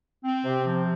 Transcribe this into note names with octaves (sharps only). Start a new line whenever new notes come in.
C4
C3
F3